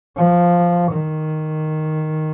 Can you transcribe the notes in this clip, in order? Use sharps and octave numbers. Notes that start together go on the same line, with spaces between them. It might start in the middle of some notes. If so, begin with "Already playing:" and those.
F3
D#3